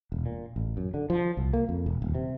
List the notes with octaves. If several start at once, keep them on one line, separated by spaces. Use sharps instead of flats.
E1
A#2
A1
F#2
D3
F3
C2
A#3
F2
E1
D#1
C3